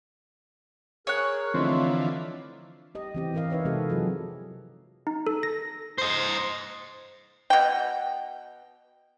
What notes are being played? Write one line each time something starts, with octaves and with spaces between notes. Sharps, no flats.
G#4 A#4 C#5 F#6
D3 E3 F3 A3 C4 D#4 F4
D5
G4 D#5
E3 C4 G4
E3 E4 A#4 D#5 F5
D#4 B4 C#5 E5
C3 G#3 C4 F#4 A4
F3 F#3 F4 G#4
D#4
A4
A#6
C5 D#5
B2 G5